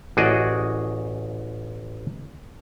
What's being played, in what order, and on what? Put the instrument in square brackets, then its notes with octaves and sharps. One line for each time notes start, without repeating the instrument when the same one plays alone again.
[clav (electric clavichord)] A1 F#4 G#4 D5 D#5 F#5